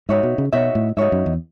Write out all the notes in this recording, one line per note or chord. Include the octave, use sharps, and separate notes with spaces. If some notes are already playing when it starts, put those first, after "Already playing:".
G#2 D#4 F#4 C#5 E5
B2
C#3
B2 D#4 F#4 C#5 E5
A2
G#2 D#4 F#4 C#5 E5
F#2
E2